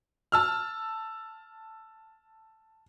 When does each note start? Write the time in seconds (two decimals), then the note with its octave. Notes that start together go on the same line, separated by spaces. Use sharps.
0.32 A5 E6 F6